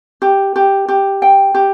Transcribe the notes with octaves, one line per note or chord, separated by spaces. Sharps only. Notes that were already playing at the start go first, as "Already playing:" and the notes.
G4
G4
G4
G5
G4